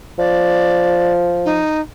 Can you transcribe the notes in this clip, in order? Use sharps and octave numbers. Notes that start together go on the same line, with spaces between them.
F3 D5
D#4